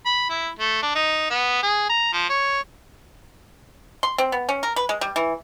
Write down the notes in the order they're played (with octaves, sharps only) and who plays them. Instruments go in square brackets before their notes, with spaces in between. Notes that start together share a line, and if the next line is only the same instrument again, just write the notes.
[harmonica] B5
E4
A3
D4
D#4
B3
G#4
A#5
F3
C#5
[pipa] C6
C4
B3
C#4
A#4
B4
G#3
G3
E3